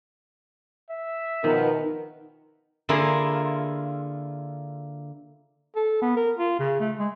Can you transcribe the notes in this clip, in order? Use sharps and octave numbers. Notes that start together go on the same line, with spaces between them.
E5
B2 D#3 F3 B3 A#4
D3 A#3 E4 F4 G#4
A4
B3
A#4
F4
C#3
A3
G#3